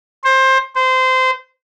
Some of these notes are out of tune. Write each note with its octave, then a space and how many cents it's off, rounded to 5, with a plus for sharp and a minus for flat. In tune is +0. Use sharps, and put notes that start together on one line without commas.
C5 +20
C5 -20